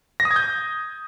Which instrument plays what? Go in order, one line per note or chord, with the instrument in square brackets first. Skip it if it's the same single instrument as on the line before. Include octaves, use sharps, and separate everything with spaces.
[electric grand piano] A#6
D#6
G#6
G6